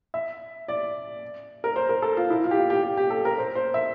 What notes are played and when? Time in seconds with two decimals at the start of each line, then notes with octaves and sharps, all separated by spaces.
0.14 E5
0.68 D5
1.64 A#4
1.76 C5
1.89 A#4
2.02 A4
2.17 F4
2.30 E4
2.44 F4
2.51 G4
2.57 F4
2.70 G4
2.83 G4
2.97 G4
3.10 A4
3.25 A#4
3.38 C5
3.55 C5
3.74 E5